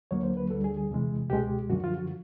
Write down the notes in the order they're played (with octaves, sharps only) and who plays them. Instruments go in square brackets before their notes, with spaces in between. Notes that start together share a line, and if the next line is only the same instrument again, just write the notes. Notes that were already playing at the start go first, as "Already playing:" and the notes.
[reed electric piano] D2 D3 F#3 A#3 C#5
C5
B4
D2 D3 G3 A4
G#4
G#4
E2 C3 E3 G#3
C#2 B2 G#3 G4
F#2 D3 F3 F#4
F4
F#4